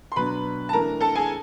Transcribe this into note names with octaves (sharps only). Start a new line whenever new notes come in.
C6
B2 F#3 B3 D4 B4 B5
A5
E3 A3 D4 A#4 A#5
A4 A5
G#4 G#5